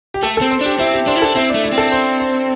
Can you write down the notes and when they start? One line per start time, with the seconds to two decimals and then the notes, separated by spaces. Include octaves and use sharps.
0.14 G4
0.23 A3 A4
0.37 C4 A4
0.51 C5
0.61 D4 G4
0.79 C4 E4
0.94 G4
1.07 D4 C5
1.16 E4
1.22 D4 A4
1.36 C4 E4
1.50 D4
1.55 A3
1.64 E4
1.73 C4
1.78 A4
1.92 C5
2.20 C5